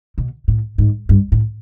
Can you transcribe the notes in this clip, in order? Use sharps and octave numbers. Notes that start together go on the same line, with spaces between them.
B2
A2
G#2
G2
A2